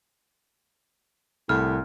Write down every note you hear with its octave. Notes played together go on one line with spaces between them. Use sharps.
C2 A2 F6